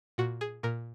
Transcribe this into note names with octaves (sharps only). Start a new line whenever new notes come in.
A#2 F#4
G#4
A#2 A#4